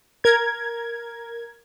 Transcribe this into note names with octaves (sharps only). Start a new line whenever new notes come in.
A#4 G#6